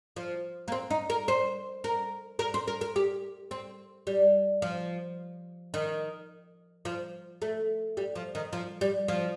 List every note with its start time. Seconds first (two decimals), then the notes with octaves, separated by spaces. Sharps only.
0.16 F3
0.68 A#3
0.72 C4
0.90 D#4
1.10 A#4
1.28 C5
1.84 A#4
2.39 A#4
2.54 C5
2.68 A#4
2.81 A#4
2.96 G4
3.51 C4
4.07 G3
4.62 F3
5.74 D#3
6.85 F3
7.42 A3
7.97 G3
8.16 F3
8.35 D#3
8.53 F3
8.81 G3
9.08 F3